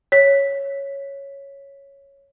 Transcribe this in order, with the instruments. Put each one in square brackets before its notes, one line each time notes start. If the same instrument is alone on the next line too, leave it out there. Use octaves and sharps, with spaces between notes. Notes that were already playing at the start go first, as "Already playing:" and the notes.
[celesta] C#5 B6